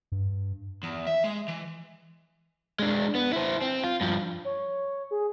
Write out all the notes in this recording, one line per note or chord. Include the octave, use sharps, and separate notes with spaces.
G2
E2
E5
G#3
E3
G#3 D4
B3
E4 C5
C4
F4
G2 F3
C#5
G#4